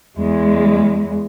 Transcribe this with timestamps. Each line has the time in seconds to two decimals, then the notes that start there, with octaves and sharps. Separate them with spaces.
0.18 E2 G#3